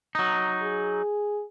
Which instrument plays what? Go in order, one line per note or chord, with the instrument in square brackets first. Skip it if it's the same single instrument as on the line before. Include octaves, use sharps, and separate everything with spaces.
[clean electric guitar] F#3 D#4
[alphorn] G#4